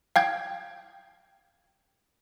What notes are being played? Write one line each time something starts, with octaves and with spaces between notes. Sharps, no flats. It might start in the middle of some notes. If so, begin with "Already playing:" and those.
F5 G5 G#6